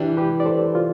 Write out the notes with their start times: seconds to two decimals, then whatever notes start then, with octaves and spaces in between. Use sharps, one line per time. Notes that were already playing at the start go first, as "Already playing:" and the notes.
Already playing: E3 G3 D4 E4 G4
0.17 G4 B4
0.40 D5
0.46 A4 C5
0.75 F4